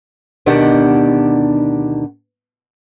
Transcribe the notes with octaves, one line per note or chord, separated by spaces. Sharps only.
D2 B2 D#3 D4 G4 F#5